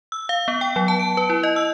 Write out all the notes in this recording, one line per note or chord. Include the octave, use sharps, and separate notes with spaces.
E6
F5
B3
G5
F#3
A5
D7
B4
E4
D#5
E6